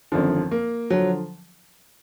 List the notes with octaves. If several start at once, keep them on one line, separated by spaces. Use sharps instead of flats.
G#1 F#2 D3 F3
A#3
D3 F3 F#3